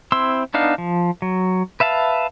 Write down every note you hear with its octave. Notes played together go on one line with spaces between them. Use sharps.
C4 E4 C6 E6
B3 D4 D#4 F5
F3
F#3
B4 E5 F5 A5